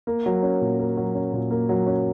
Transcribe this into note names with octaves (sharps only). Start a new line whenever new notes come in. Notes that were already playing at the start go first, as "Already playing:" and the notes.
A#3
F#3
C#4
A#2
A#3
F#3
C#4
A#2
A#3
F#3
C#4